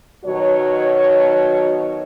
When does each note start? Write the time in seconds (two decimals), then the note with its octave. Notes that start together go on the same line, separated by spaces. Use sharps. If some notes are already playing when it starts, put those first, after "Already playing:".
0.25 B2 D#3 F#3 F#4 C#5